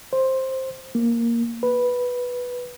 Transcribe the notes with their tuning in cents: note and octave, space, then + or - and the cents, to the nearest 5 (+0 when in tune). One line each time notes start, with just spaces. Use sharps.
C5 +10
A#3 +0
B4 -5